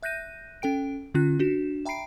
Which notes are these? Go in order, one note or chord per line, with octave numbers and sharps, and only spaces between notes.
E5 F#6 G6 A#6 D#7
C#4 A4 G5 D7
D3 C#4 F4 F#6
D4 F#4 E7
E5 G5 A#5 B5 C7 D7